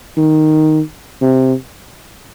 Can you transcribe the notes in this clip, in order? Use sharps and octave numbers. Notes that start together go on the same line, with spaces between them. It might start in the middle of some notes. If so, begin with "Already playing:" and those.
D#3
C3